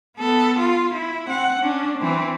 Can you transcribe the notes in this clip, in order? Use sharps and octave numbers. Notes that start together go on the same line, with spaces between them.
B3 A4
F4
E4
C4 F#5
C#4 D4
E3 C4